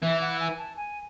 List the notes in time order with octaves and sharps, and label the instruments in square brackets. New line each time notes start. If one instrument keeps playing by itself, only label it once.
[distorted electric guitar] E3 [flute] E5
[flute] F#5
G#5
A5
G#5